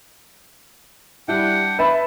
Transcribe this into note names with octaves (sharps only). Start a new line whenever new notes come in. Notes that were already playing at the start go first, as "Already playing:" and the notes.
G3 D4 E4 F#5 G5
B4 E5 A5 B5